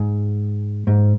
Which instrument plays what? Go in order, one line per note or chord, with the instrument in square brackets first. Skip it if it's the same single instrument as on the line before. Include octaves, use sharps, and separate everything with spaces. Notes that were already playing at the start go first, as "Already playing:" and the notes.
Already playing: [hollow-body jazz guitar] G#2
G#2